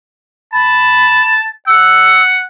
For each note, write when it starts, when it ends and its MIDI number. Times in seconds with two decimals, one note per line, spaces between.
0.53 1.48 81
0.53 1.35 83
1.67 2.44 78
1.67 2.22 88